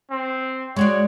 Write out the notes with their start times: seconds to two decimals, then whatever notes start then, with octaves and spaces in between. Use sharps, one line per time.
0.11 C4
0.76 G#3 F#4 C#5 D5